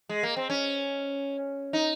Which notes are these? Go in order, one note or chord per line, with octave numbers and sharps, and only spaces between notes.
G#3
A#3
C4
C#4
D#4